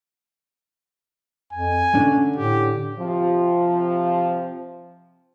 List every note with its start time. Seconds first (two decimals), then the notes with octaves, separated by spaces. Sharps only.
1.53 F2 G#5
1.95 D3 C#4 D4
2.37 A2 G4
2.98 C3 F3